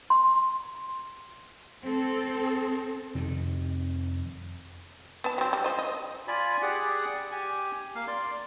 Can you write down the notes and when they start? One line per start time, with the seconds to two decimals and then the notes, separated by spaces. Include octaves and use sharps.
0.10 C6
1.84 C4 A4
3.15 F2 C3 D#3
5.24 B3 A5
5.38 F#3 C4
5.53 G3
5.64 F3 C5 D#5
5.79 D#5
6.28 F4 D5 G#5 B5
6.62 G4 G#4 D5 F#5
7.31 G4 G#5
7.95 A#3 F5
8.08 D5 C6